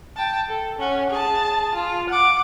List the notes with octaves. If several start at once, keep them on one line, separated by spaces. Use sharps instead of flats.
G5 A5
A4
C#4 F#5
G#4 A5
F4
F#5 D6